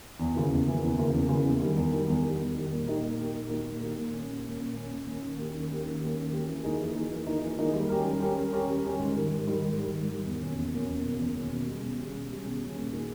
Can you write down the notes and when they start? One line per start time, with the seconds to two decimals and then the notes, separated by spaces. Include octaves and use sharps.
0.19 E2
0.35 C#3 E3 A#3
0.51 E2
0.67 C#3 E3 A#3
0.82 E2
0.98 C#3 E3 A#3
1.13 E2
1.29 C#3 E3 A#3
1.45 E2
1.60 D#3 G3
1.76 E2
1.92 D#3 G3
2.07 E2
2.23 D#3 G3
2.39 E2
2.54 D#3 G3
2.71 A#2
2.87 A#3 D#4 G4 A#4
3.02 A#2
3.17 A#3 D#4 G4 A#4
3.34 A#2
3.49 A#3 D#4 G4 A#4
3.65 A#2
3.81 A#3 D#4 G4 A#4
3.97 A#2
4.12 A#3 C#4
4.27 A#2
4.44 A#3 C#4
4.60 A#2
4.75 A#3 C#4
4.91 A#2
5.07 A#3 C#4
5.22 D#3
5.37 A#3 C#4 G4
5.54 D#3
5.70 A#3 C#4 G4
5.85 D#3
6.00 A#3 C#4 G4
6.16 D#3
6.32 A#3 C#4 G4
6.48 E3
6.64 A#3 D#4 G#4
6.80 E3
6.95 A#3 D#4 G#4
7.11 E3
7.26 A#3 D#4 G#4
7.42 E3
7.58 A#3 D#4 G#4
7.73 G3
7.89 C#4 G4 A#4
8.05 G3
8.20 C#4 G4 A#4
8.37 G3
8.53 C#4 G4 A#4
8.68 G3
8.84 C#4 G4 A#4
8.99 G#2
9.15 D#3 G3
9.31 G#2
9.47 D#3 G3
9.62 G#2
9.78 D#3 G3
9.93 G#2
10.09 D#3 G3
10.25 E2
10.41 B2 A#3 C#4
10.56 E2
10.72 B2 A#3 C#4
10.88 E2
11.04 B2 A#3 C#4
11.19 E2
11.35 B2 A#3 C#4
11.51 B2
11.66 G3 C#4 G#4
11.82 B2
11.98 G3 C#4 G#4
12.14 B2
12.30 G3 C#4 G#4
12.45 B2
12.61 G3 C#4 G#4
12.76 A#2
12.92 A#3 D#4 G#4